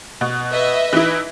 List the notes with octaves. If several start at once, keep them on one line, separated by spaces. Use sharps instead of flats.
B2
B4 D#5 E5
E3 D#4 E4